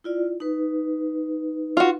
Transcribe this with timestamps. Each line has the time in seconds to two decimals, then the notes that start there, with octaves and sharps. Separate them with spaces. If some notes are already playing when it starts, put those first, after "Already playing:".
0.04 E4 F4 D5
0.40 D#4 B4
1.77 F4 F#4